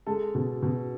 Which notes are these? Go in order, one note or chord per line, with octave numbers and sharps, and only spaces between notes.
G#3 A4
B2
B2